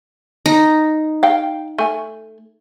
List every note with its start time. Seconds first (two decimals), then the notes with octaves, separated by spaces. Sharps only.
0.46 D#4
1.23 F5 G5
1.78 A3 G#5